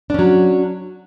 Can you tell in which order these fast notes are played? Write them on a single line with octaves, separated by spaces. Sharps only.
D4 C#4 F#3